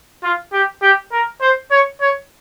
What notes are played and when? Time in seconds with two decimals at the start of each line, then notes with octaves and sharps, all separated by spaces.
0.23 F4
0.53 G4
0.82 G4
1.12 A#4
1.41 C5
1.71 C#5
2.01 C#5